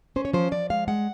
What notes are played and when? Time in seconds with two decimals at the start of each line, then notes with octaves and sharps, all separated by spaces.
0.16 C#4 C5
0.25 C#5
0.33 F3 C5
0.51 F3 D5
0.70 G#3 F5
0.88 G#3 F#5